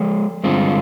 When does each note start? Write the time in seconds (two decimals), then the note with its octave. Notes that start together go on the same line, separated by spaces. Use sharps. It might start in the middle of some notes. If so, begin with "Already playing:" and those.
Already playing: F3 G#3
0.43 G2 D3 G#3 C4 F4